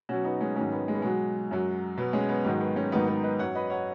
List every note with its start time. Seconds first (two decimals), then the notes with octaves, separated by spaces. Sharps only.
0.09 B2 F#3 C#4 F#4
0.24 B3 D#4
0.41 G#3 C#4
0.56 G#2 D#3 F#3 G#3 C#4
0.72 B3
0.88 G#3
0.95 B3
1.02 B2 F#3 G#3
1.51 F#2 F#3
1.97 B2 F#3 B3
2.13 G#3 C#4
2.29 B3
2.45 G#2 D#3 F#3 G#3
2.61 B3
2.76 G#3 C#4
2.92 G#2 D#3 F#3 B3 D#4
3.08 B3 D#4
3.23 B4 D#5
3.39 F#2 F#3 C#5 F#5
3.55 B4 D#5
3.70 C#5 F#5